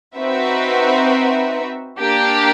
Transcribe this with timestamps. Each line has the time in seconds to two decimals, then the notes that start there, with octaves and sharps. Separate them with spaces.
0.17 C4 D#4 F#4 B4 E5
2.00 A#3 D4 G4